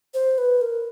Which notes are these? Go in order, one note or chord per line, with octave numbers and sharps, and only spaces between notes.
C5
B4
A#4